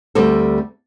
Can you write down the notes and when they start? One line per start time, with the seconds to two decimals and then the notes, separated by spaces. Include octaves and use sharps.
0.15 D2 G3 C4 A4